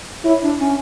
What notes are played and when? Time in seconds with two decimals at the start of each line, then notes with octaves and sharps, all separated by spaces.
0.25 E4 C#5
0.42 D4
0.59 C#4